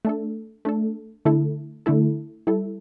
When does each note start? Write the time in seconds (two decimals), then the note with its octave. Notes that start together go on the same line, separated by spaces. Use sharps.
0.05 A3 D4 A4
0.65 A3 D4 A4
1.25 D3 A3 E4 A4
1.86 D3 A3 E4 A4
2.47 G3 E4 A4